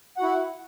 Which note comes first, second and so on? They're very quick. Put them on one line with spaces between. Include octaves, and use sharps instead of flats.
F#5 F#4 E4